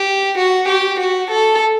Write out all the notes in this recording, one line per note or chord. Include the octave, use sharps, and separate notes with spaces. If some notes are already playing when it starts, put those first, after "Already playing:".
Already playing: G4
F#4
G4
F#4
A4